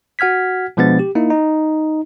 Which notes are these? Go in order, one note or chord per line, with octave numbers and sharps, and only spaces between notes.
F#4 F#5 F6 G#6 B6
B2 F3 G#3 B3 D4 A6
G4
A#3 D#4 E4
D#4